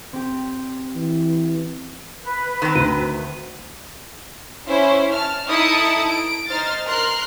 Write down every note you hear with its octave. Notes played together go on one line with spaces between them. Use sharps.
C4 G4
E3
B4
D#3 C4
D2 D#7
C#4 E4 C5
A5 F6
D#4 E4 A4 A5 D#6 C#7
D7
D#4 C5 F6 A6
A#4 C6 F6 F#6